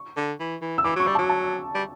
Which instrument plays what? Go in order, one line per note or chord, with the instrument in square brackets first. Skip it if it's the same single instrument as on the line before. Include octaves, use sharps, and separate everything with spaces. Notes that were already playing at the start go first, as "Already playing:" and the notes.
Already playing: [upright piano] C#6
[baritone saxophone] D3
E3
E3
[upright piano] E6
[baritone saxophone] E3 [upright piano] D6
[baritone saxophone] F#3
[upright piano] C#6
[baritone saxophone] G3
[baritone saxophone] F#3 [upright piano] A5
[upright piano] A5
[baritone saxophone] G3